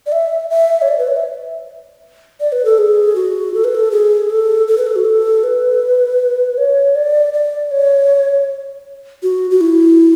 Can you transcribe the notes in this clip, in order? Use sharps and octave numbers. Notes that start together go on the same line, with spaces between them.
D5
E5
E5
C#5
D5
B4
C#5
E5
D5
B4
A4
G#4
F#4
A4
B4
A4
G#4
A4
A4
B4
A4
F#4
A4
B4
C#5
D5
D5
C#5
F#4
F#4
E4